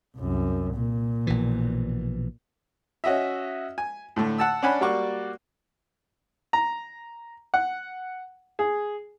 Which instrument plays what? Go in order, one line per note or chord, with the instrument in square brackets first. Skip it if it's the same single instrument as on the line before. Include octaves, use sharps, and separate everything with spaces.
[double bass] C2 F#2
A#2
[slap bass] A#1 B2 E3
[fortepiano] C#4 F#4 D#5 E5
G#5
A2 D3 A3
F#5 A5 E6
C#4 D4 D5 F#5 G#5 B5
G3 A#3 F#4 D5 C#6
A#5
F#5
G#4